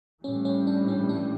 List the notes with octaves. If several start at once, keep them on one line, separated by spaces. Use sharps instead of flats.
A2 E3 G3 C#4
C#4
D4
C#4
D4